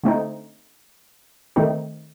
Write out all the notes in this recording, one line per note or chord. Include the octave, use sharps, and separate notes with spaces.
D3 A3 C4 D#4
D#3 A3 C4 D#4